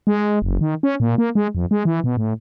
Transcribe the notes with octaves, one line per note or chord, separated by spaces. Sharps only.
G#3
F#1
D#3
C#4
A#2
A#3
G#3
F2
G#3
E3
B2
A2